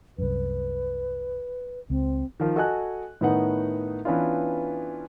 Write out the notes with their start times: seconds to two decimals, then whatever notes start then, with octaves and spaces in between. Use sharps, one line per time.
0.18 C2 F#2 B4
1.90 C#2 C4
2.40 D#3 F3
2.56 F#4 A4 D#5 G#5 F#6
3.21 A2 D#3 B3 D#4 F#5
4.05 E3 B3 C#4 D4 F4